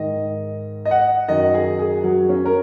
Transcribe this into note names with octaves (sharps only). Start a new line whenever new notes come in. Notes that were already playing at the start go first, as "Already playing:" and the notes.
Already playing: G#2 D#3 D#5
D#5
F#5
F#2 D#3 D#5
G#4
G#4
F#3
C#4
A#4